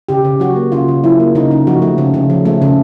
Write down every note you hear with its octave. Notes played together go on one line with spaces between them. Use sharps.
C#3 G4
C#3
F#3 F#4
A#3
C#3 F4
C#3
F#3 E4
A#3
C#3 D#4
C#3
F3 F#4
A3
C#3
C#3
F3
A3
C#3